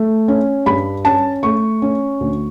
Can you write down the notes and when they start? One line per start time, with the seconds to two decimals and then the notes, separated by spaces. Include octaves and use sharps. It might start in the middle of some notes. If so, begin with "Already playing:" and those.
Already playing: A3
0.28 C#4
0.66 G2 B5
1.05 C#4 A5
1.43 A3 C#6
1.82 C#4
2.20 D2